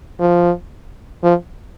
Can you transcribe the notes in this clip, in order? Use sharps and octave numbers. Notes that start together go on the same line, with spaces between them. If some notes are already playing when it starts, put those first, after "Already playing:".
F3
F3